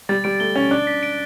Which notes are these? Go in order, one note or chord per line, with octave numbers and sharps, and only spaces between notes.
G3 A6
G3 D7
A3 G7
C#4 A6
D4 F#6
B6
D7